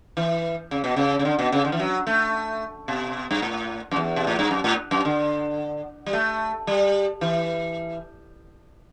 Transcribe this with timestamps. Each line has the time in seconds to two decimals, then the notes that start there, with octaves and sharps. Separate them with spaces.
0.17 E3
0.71 C#3
0.84 B2
0.96 C#3
1.19 C#3
1.25 D3
1.39 B2
1.52 C#3
1.65 D3
1.72 E3
1.79 F#3
2.07 A3
2.88 B2
3.31 G2
3.42 A2
3.91 F#2
3.96 E2
4.16 B2
4.27 A2
4.39 G2
4.51 F#2
4.64 A2
4.91 F#2
5.05 D3
6.06 G3
6.13 A3
6.67 G3
7.21 E3